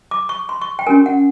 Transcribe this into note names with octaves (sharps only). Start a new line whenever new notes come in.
D6
C#6
C6
C#6
G5
C#4 F#4 A#4 G#5
F#5